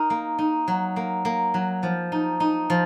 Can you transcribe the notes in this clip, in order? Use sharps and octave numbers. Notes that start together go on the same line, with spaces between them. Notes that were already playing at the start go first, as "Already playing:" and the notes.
Already playing: D#4 A#4
A#3
D#4
F#3
A#3
A#3
F#3
F3
D#4
D#4
F3